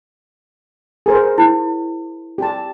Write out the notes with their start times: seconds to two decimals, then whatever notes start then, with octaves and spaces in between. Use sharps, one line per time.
1.06 G#4 A#4 C5
1.38 E4
2.38 G4 A5